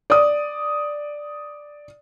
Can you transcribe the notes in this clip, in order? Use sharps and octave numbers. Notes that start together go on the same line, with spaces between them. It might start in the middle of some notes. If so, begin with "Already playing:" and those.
D5 D#6